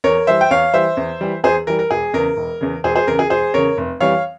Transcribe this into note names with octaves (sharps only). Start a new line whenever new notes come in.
E2 A#4 C#5
E3 G3 C5 E5
G5
E2 C#5 F5
E3 G3 C5 E5
E2
E3 G3
E2 G#4 C5
E3 G3 A#4
A#4
E1 G#4
E2 C#3 A#4
E1
E2 C#3
E1 G#4 C5
G#4 C5
E2 C#3 A#4
G#4
E1 G#4 C5
E2 C#3 A#4 C#5
F1
F2 E3 G3 C#5 F5